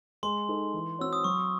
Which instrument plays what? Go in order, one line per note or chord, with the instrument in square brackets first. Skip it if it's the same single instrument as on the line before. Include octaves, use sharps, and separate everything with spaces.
[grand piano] G#3 [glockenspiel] C6
[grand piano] D#4 A4
E3
[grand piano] C4 F#4 C#5 [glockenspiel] E6
[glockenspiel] D#6
[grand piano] F#3 [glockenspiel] C#6